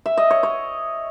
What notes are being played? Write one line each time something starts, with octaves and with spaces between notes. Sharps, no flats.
E5
D#5
C#5
C#5